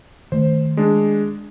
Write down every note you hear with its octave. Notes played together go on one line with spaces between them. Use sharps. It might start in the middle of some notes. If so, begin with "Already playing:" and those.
D#3 A3 C5
G#3 D4